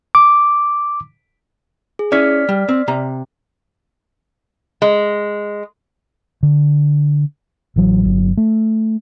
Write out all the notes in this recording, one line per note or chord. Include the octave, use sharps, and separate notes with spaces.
D6
G#4
C#4 E4 C#5 D5 F6 B6
G3
C4
C3 A#5
G#3
D3
A1 E3 F#3
G1 F#3
A3